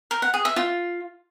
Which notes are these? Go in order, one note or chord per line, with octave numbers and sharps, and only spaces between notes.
A#4
F#5
G#4
E5
F4